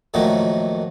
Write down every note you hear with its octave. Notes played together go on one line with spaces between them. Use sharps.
F2 A#2 D#3 F#3 A3